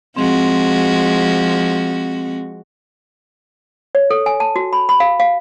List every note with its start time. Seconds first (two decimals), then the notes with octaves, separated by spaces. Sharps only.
0.16 F3 G#3 C4 F#4
3.95 C#5
4.10 A4
4.26 G#5
4.40 A5
4.56 F#4
4.73 B5
4.89 B5
5.00 F5
5.20 F5